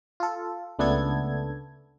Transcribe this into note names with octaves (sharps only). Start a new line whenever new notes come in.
F4 A4
C#2 A3 B3 D4 A4 G#6